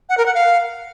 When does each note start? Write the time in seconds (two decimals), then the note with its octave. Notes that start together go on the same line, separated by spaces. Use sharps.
0.09 F#5
0.18 A#4
0.26 F#5
0.34 F5